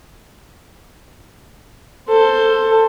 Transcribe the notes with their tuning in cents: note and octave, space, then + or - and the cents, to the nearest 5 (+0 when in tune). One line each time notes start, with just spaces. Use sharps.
A4 +15 C5 +10